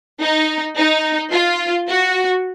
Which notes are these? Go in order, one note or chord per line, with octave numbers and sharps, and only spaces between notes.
D#4
D#4
F4
F#4